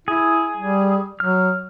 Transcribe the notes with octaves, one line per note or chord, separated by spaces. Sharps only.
E4 G#4
G3
F#3 F6